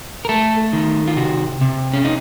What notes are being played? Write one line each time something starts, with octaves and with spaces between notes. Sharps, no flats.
A#4
A3 A4
D#3
F4
C3 F#4
C3
C#4
D#4